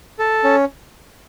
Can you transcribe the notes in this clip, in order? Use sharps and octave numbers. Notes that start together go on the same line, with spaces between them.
A4
C#4